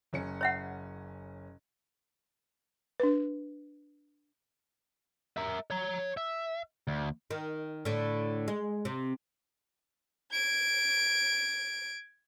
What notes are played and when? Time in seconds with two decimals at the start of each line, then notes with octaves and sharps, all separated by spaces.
0.13 F#1 C#4 C#7
0.41 C#5 E5 F#5
3.00 D4 B4
5.37 A#4 E5
5.70 C#5 A#5
6.17 E5
6.87 D2
7.31 D#3
7.85 A2 D3
8.48 G#3
8.85 C3
10.33 G#6 D7